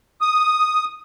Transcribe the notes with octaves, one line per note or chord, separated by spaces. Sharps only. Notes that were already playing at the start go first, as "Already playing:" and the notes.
D#6